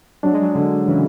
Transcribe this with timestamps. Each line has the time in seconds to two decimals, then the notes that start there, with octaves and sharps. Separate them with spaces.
0.23 F#3 D4
0.32 G#3
0.41 F#3
0.55 D3
0.87 C#3 E3